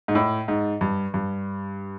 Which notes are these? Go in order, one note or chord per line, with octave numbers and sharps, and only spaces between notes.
G#2
A2
G#2
G2
G2